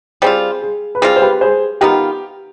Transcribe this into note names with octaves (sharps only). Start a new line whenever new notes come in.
G3 C4 F4 G#4 C5
G#4
B4
G3 C4 F4 G#4
C5
G4 B4
G#4 C5
D#3 B3 F4 G4